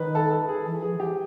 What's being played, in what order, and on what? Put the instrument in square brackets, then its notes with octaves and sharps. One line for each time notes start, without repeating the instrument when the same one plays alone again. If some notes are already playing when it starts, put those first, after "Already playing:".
Already playing: [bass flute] D#3 [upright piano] B4
[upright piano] A4
A4
G#4
[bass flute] E3
[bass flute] F3 [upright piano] G#4
[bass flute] E3 [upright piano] G4